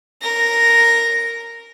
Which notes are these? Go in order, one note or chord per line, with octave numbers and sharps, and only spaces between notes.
A#4 A#6